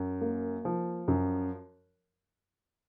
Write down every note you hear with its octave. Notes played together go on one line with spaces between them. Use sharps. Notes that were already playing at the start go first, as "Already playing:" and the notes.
Already playing: F#2
A#3
F3
F#2